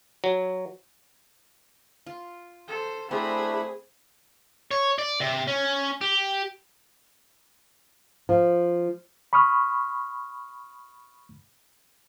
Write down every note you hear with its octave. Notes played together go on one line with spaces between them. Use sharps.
F#3
F4
A4 C5
A3 C4 D4 E4 G#4 B5
C#5
D5
C3
C#4
G4
F3
B5 C#6 D#6 F6